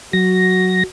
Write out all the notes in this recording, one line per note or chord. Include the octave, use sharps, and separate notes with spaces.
F#3 F#4 A#6